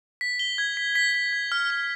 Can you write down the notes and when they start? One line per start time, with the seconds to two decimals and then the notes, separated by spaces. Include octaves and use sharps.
0.21 B6
0.39 G7
0.58 G#6
0.77 B6
0.95 B6
1.14 B6
1.33 G#6
1.52 F6
1.70 F6